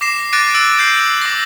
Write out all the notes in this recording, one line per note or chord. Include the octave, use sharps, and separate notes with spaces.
D6 A#6 C7 E7
D6 F#6 A6 A#6 D7 D#7
E6 A6 D7
G6 C7
F#7
D6 A#6